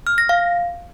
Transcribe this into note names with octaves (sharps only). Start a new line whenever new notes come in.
F6
A#6
F5